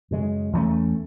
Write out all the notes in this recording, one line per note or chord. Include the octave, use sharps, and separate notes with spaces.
F#2 C#3 G#3
E2 D3 A3 C#4